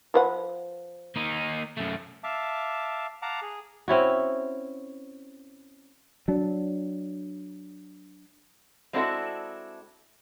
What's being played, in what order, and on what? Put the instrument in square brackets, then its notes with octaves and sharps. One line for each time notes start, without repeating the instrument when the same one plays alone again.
[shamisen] F3 B4 F#5
[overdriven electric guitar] A#3 D#4
F#2 A3
[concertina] E5 F5 A5 D6
F5 F#5 A5 A#5 D6
G#4
[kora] C4 C#4 E4 F#4
[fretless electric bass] F#3 D4
[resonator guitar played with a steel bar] G#3 C4 D4 E4 F#4 A4